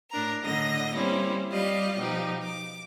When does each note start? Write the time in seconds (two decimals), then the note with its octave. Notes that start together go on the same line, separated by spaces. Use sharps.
0.11 A2 D4 A#4 A#5
0.41 A2 D3 D#5 A#6
0.94 G3 A#3 C4 C#4 E4
1.51 G3 F4 G4 D5 D#5
1.98 B2 F3 D#4 G4
2.42 D6